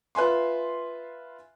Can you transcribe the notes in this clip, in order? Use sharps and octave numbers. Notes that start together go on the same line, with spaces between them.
F4 B4 E5 G#5 C6